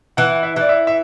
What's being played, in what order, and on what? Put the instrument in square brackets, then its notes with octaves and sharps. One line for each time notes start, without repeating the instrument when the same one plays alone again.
[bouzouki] E3 [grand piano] F#5
[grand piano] F#5
E5
[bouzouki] E3 [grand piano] D5
[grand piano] E5
E5